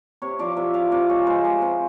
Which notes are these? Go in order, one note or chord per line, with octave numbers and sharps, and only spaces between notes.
C3 C#5
F3 D5
C3 E5
F3 F5
C3 D5
G#3 C#5
G#3 C5
G#3
C3